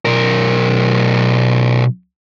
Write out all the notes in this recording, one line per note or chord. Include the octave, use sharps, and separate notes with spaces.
B1 A#4